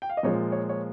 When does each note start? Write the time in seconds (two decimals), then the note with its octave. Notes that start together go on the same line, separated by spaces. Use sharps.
0.02 G5
0.09 F5
0.17 D#5
0.23 A#2 F3 G#3 C#5
0.52 C#5
0.69 C#5